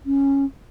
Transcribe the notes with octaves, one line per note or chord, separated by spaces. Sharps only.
C#4